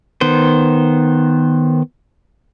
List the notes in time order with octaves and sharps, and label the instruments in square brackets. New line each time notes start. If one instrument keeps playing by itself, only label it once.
[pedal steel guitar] D#3 B3 C5